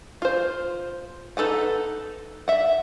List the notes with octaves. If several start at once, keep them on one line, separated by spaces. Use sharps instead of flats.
F4 C5
D#4 A4 B4 F#5
E5 F#5